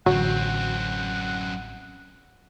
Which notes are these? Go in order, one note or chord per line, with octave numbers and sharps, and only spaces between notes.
A1 F#2 D3 F#3 C4 F#5